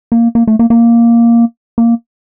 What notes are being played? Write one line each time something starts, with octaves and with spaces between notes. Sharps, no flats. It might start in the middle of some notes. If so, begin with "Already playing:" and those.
A#3
A#3
A3
A#3
A#3
A#3